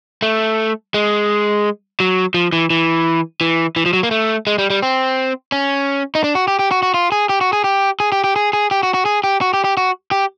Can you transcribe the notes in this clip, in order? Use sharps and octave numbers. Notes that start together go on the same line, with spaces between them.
A3
G#3
F#3
F3
E3
E3
E3
E3
F3
F#3
A#3
A3
G#3
G3
G3
C4
C#4
D#4
D4
F#4
G4
G4
F#4
F#4
F4
G#4
G4
F#4
G#4
G4
G#4
G4
G4
G#4
G#4
G4
F#4
F#4
G#4
G4
F#4
G4
G4
F#4
G4